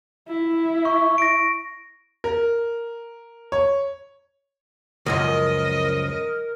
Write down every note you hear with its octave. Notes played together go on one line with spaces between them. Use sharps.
E4
C#6
A#6 D7
A#4
C#5
C#2 F#2 F3 A#4 D#5